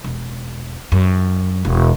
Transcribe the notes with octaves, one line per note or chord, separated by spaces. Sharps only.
E1
F#2
E1